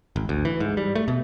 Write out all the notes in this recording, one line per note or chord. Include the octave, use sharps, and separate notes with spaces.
G#1
D2
E3
G#2
G3
A3
B2